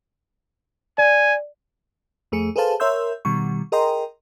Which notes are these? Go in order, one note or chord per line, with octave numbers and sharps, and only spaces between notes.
D5 G#5
F2 A3 G#4 C#7
G#4 A4 B4 C5 F5 A5
A#4 C#5 E5 C6 E6 G6
B2 D#3 G3 C#6
G#4 A#4 D#5 G5 A#5 C6